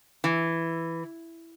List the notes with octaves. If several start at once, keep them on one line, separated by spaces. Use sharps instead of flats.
E3